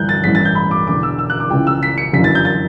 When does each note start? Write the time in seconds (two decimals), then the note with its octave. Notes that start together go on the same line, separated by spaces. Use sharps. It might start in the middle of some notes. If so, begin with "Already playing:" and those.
Already playing: G1 G2 E3 F#6 G6
0.09 A6
0.24 A1 G2 E3 B6
0.35 A6
0.45 G6
0.55 B5
0.71 D6
0.87 E1 E2 D3 D6
1.03 E6
1.19 E6
1.30 F#6
1.40 D6
1.50 C#2 C#3 E3 G5
1.67 E6
1.83 B6
1.98 C#7
2.13 G1 F#2 E3 B6
2.24 A6
2.35 G6
2.45 A6